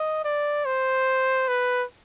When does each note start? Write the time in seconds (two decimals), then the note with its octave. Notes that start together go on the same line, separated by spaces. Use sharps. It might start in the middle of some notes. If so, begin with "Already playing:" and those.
Already playing: D#5
0.24 D5
0.65 C5
1.48 B4